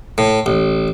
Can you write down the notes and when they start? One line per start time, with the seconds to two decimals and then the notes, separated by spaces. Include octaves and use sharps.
0.18 A2
0.46 A1